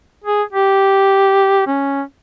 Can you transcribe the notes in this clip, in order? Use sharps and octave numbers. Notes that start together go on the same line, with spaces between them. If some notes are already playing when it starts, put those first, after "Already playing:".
G#4
G4
C#4